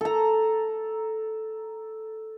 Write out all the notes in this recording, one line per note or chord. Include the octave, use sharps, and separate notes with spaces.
A4 A#5